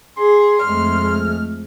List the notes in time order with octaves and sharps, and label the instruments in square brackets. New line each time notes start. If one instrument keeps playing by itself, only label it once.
[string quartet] G#4 [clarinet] C6
[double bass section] F2 G#3 A3 [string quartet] F6